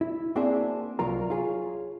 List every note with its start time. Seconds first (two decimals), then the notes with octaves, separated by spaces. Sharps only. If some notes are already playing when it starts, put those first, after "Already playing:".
0.01 E4
0.36 A#3 C4 D4 F#4 G#4 E5
0.99 C2 F#3 F4 A#4 A#5
1.30 F4 G#4 C#5